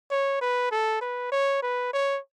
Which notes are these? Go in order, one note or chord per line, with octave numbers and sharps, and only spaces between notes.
C#5
B4
A4
B4
C#5
B4
C#5